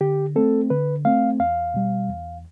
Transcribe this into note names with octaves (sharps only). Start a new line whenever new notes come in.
D3 G4
A3 C4 A4
D3 B4
A3 C4 F5
E2 F5
B2 G3
E2